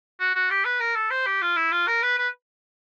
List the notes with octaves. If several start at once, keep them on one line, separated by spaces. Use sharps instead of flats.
F#4
F#4
G4
B4
A#4
A4
C5
G4
F4
E4
F4
A#4
B4
B4